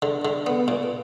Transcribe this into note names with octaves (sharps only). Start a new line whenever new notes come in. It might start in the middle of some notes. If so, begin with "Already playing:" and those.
D3
D3
B3
A#2